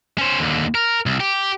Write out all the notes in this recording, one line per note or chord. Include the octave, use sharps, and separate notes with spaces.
C#4 C5
D#2 D3
A#4
C2
G4